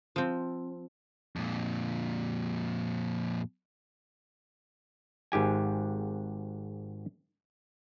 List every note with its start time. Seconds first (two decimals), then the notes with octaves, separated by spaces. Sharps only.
0.16 F3 C4
1.36 F2 A#2
5.32 G#1 G#2 G4 G#5